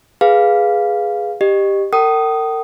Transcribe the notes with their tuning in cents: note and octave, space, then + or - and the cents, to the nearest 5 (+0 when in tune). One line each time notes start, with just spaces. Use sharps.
G#4 +0 B4 -10 F5 +0
G4 +5 D#5 -30
A#4 -40 G5 -40 D#6 -5